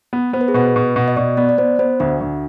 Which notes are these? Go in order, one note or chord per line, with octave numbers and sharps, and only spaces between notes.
B3
B3 C5
B4
G#4
B2 B4
B2
B2
D#5
B2 D5
B3 D5
D5
B3 C5
B3 C5
D2 D4
D2